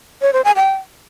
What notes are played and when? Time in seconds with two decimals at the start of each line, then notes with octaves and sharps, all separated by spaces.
0.22 C#5
0.33 C5
0.45 G#5
0.56 G5